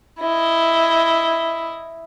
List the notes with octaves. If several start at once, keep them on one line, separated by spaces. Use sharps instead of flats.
E4 D#5